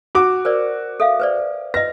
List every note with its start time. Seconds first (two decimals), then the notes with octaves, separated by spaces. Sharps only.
0.15 F#4 D6
0.45 A#4 C5 D5
1.00 A4 E5 F5
1.20 B4 C5 D5
1.74 B4 D#5 A#6